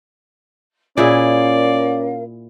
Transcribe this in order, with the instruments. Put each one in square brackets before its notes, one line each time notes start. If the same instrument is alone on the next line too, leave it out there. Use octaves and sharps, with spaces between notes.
[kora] A#2 E4 G#4 [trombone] C#4 [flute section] A#4 F5 [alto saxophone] D5